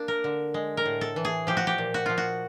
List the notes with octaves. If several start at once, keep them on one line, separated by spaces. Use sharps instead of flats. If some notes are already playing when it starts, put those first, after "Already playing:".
Already playing: A#3 D4
A#4
D3
G#3
A#4
A2
A4
E3
G#4
F3 G4
F#4
G4
A#2
F#4
F3 F4
F#4